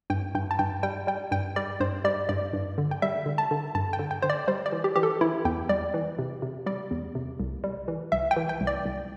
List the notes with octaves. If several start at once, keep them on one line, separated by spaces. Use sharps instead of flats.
G2 G5
G2 G5
A5
G2 G5
G3 G5
G3 G5
G2 G5
G3 D5
G2 C5
G3 D5
G2 D5
G2
D3
G5
G3 E5
D3
A5
D3
G2 A5
G5
D3
G5
D3 C5
D5
G3 C5
D5
E3
G4
E3 G4
A4
E3 E4
E2 G5
G3 D5
E3
C3
C3
G3 D5
E2
C3
C2
G3
E3
C2 E5
G5
E3
G5
C2
D5
C2